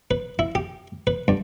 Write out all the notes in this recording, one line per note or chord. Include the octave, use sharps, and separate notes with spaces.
B4
E4
G4
B4
G2